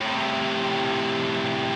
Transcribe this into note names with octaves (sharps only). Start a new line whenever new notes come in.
A2 C3